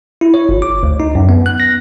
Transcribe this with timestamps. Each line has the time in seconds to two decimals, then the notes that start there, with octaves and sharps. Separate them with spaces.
0.21 E4
0.34 C#5
0.49 G1
0.62 D6
0.83 D2
1.00 D#4
1.15 F#2
1.29 B3
1.46 F#6
1.60 A#6